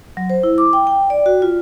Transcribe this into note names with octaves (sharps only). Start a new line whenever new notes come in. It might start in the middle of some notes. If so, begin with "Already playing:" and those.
F#3
C5
E4
D6
G5
G5
D5
F#4
F4